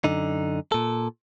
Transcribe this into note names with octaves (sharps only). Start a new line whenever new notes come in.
F#2 D3 D#4
A#2 A4